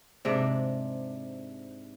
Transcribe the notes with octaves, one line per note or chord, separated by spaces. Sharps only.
G#2 C3 D4